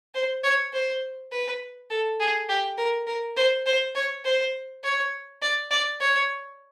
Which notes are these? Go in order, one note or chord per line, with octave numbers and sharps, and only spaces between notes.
C5
C#5
C5
B4
A4
G#4
G4
A#4
A#4
C5
C5
C#5
C5
C#5
D5
D5
C#5